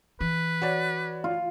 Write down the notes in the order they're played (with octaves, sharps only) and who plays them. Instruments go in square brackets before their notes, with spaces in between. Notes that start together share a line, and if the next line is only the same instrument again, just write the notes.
[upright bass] E3 [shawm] B4
[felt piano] F#4 C#5 D5
[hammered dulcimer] F4